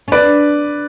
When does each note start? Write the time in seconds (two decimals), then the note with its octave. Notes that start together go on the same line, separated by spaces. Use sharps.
0.08 C#4
0.12 D4 B4 D5